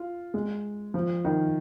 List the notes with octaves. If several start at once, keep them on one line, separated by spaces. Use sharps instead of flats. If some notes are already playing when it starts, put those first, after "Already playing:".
Already playing: F4
G#3
F3
D#3